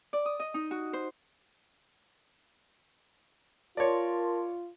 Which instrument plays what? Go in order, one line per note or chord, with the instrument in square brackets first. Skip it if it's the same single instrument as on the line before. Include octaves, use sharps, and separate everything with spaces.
[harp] D5
D#6
D#5
D#4
F#4
C5
[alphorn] F4 [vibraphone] A#4 A5 C6 [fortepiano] C#5 D5